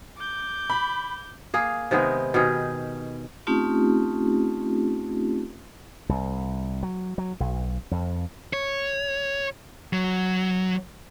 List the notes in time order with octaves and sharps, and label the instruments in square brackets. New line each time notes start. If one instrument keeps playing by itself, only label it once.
[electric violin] D6 G6
[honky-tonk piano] B5
[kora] A#3 G#4
C3 D#3 G#3 B3
B2 D#3 G4 G#4
[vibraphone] A3 C4 C#4 D#4 F4 G4
[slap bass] C2
F#3
F#3
B1
F2
[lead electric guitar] C#5
F#3